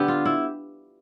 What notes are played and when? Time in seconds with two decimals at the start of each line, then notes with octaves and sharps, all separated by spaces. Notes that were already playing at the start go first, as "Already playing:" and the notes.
Already playing: D3 B3 G4
0.08 F4
0.26 E4